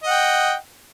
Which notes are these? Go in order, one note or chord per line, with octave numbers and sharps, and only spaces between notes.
D#5 F#5 G5